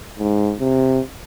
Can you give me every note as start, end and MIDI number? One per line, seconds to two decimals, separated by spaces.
0.19 0.55 44
0.60 1.00 48